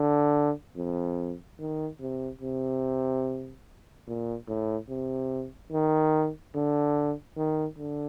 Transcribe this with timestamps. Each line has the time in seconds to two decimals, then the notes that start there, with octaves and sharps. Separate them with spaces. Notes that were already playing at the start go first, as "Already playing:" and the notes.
Already playing: D3
0.76 F2
1.59 D#3
2.00 C3
2.41 C3
4.07 A#2
4.48 A2
4.89 C3
5.72 D#3
6.55 D3
7.37 D#3
7.79 D3